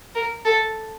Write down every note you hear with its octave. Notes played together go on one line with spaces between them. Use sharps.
A#4
A4